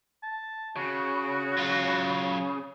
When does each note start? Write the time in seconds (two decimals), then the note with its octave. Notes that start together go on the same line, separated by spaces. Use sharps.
0.23 A5
0.76 C#3 F#4
1.58 F#3 F4